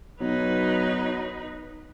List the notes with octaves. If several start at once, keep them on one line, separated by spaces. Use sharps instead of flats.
B1 F#3 D#4 B4